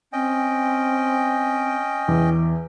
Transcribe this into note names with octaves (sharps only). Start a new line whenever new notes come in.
C4 C#4 D#5 G5
E2